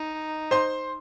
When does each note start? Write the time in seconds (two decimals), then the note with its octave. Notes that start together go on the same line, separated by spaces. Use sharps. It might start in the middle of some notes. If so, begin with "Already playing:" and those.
Already playing: D#4
0.51 C5 C6